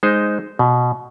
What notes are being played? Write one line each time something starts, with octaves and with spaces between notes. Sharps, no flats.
G#3 D#4 C5
B2